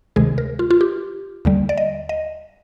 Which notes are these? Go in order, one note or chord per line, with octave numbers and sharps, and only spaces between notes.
D2 C3 D#3 G#3 G#4
A#4
F4
F4
G4
D#2 D3 G3
D5
D#5
D#5